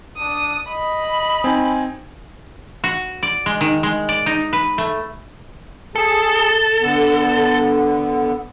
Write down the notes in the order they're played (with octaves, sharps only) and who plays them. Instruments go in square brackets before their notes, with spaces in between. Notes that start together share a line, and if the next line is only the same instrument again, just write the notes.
[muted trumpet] D4 [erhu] D#6
[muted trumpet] D#5 [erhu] B5
[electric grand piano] C4 D#4 [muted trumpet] G#5
[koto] F#4
D5
G#3
D#3
G#3
D5
D#4
B4
A3
[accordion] G#4 A5 [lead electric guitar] A4
[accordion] D3 B3